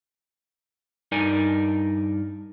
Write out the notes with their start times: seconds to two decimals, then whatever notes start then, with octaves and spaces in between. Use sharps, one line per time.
1.12 G2 D#4 A#4 D5 G#5